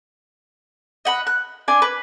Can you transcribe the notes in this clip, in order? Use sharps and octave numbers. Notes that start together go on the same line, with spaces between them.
D#5 F#5 B5
F#6
D4 D5 G#5
B4